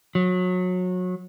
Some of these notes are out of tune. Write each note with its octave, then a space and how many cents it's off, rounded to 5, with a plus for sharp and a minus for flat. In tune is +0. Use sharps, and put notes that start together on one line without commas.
F#3 -25